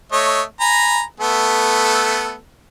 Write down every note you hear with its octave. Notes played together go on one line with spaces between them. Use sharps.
A3 C#5 D#5
G#5 A#5 B5
A3 B3 A4